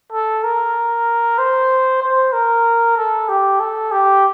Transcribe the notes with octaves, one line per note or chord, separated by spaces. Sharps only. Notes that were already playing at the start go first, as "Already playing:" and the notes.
A4
A#4
C5
C5
A#4
A4
G4
A4
G4